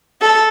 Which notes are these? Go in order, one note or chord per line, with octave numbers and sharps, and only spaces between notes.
A4